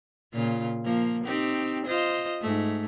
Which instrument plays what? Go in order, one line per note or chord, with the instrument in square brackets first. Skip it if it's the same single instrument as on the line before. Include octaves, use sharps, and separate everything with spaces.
[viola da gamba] A#2 C#3 F4
F3 A#3
C4 D#4 G4
F4 C5 D#5
G#2 A3